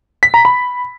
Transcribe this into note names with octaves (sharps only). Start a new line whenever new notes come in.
B6
A#5
B5